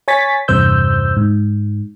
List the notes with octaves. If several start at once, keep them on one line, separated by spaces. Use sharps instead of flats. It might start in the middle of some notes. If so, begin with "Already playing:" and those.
C#5 G#5 C#6 A6 B6
E2 G2 C3 C5 E6 G6
G#2